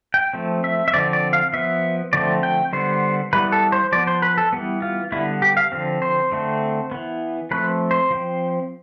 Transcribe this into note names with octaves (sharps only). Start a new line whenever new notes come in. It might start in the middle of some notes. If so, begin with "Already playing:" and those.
G5
F3 A3 C4
E5
E5
D3 F3 C4 D5
D5
F5
F3 B3 E5
D3 F3 A3 C4 D5
G5
D3 G3 B3 C5
E3 G3 B3 B4
A4
C5
F3 B3 D5
C5
B4
A4
E3 G3 B3
F4
D3 G3 B3 E4
G4
F5
D3 F3 C4
C5
D3 A3 C4
E3 B3
F3 A3 C4 B4
C5
F3 C4